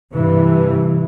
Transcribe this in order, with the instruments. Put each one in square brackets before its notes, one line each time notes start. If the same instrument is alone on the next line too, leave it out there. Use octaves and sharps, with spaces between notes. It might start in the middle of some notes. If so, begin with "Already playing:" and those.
[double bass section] G2 C3 E3